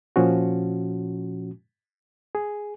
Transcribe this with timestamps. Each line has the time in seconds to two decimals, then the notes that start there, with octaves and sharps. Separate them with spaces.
0.16 A#2 F3 C#4 F#4
2.35 G#4